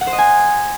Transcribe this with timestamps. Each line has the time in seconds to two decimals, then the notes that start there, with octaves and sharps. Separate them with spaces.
0.01 F#5
0.07 C5
0.13 D#5
0.18 G#5